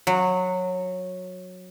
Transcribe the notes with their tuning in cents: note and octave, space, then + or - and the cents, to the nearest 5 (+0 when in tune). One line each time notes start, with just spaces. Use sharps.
F#3 -15